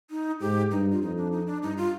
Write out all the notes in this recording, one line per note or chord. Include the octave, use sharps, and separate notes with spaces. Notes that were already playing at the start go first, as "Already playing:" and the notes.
D#4
G#2 G4
G2 D#4
F4
F2 D#4
D4
D#4
D4
G2 D#4
F4